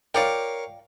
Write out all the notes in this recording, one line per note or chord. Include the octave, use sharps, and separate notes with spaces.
F4 A#4 C#5 D5 F5 G5